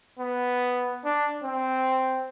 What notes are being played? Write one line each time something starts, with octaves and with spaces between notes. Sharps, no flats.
B3
D4
C4